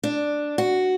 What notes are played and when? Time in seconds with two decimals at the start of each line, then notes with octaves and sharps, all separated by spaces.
0.03 D4
0.58 F#4